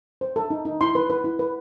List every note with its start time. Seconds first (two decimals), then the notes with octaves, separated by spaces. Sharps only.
0.21 C5
0.36 A4
0.50 D#4
0.65 D#4
0.81 E4 C6
0.95 B4
1.10 B4
1.24 E4
1.39 B4